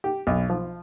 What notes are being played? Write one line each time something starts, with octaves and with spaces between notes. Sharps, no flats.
G4
B1
F3